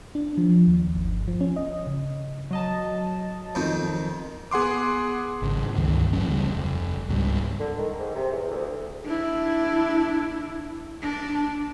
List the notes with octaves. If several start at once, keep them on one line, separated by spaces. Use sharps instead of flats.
D4
F3
D#2
G1
F3
C#4
D#5
C#3
F#3 D#5 A5
F2 D#3
B3 G#4 F#5 C6 D6
G#1 C#3
C#2 G2 D#3 E3
A1 E3 F#3 C#4
D2 C#3 E3 G3
F1
C#2 G#2 G3
D3
D#3
G#2
C3
E2
D2
D4 E4
D4